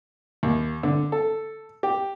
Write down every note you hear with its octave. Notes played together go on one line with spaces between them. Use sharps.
D#2
D3
A4
G4